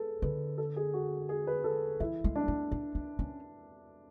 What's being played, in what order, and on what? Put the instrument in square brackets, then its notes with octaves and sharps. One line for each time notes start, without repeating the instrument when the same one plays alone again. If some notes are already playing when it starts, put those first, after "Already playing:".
Already playing: [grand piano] G#4 A4 B4
[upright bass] D3 [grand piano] B4
[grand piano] A4
G#4
F#4
G#4
B4
A4
[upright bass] E3 [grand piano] E4
[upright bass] G#3
[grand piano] D4
[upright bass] A3
D4
D4
C#4